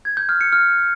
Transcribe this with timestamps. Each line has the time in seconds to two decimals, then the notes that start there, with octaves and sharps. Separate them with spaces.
0.05 G#6
0.17 G6
0.29 F6
0.41 C#7
0.52 F6